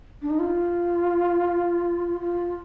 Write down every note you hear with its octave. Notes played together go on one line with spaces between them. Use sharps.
D4
D#4
F4
F4